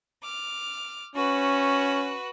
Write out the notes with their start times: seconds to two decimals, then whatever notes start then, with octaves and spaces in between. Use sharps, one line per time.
0.24 D6 F6
1.16 C#4 F#4 B4